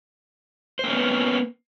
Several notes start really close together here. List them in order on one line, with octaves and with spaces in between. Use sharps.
C5 A#3 C#4 B3